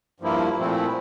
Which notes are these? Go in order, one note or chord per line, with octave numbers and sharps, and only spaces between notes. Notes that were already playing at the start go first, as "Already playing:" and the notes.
G2 F3 A#3 E4
A#2 F3 A3 C4 E4